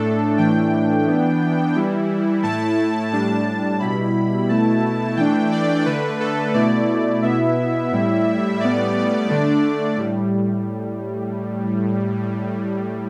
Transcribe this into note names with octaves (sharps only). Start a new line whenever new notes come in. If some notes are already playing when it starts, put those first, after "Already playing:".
Already playing: A2 A3 D4 A4
A2 E3 A3 D4 G5
E3 B3 D4
E3 G3 E4
A2 A3 E4 A5
A2 G3 D4 A5
B2 G3 E4 B5
B2 A3 E4 A5
E3 A3 D4 G5
D5
D3 A3 D4 B4
A4
B2 A3 E4 D5
B2 B3 E4 E5
A2 G3 E4
A2 G3 B3 D5
D3 A3 D4
A2 G3